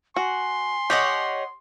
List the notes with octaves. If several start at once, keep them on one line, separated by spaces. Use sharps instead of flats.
F#4 G#5 C6
G4 C#5 D#5 F#5